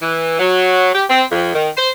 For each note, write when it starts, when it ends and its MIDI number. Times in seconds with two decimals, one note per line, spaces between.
0.02 0.39 52
0.39 0.91 54
0.94 1.04 67
1.10 1.24 60
1.32 1.51 41
1.54 1.69 51
1.77 1.90 72